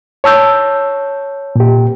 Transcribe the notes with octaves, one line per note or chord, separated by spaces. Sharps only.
C#5 A5 E6 G6
A#2 G4